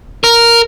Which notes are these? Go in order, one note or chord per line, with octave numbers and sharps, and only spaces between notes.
A#4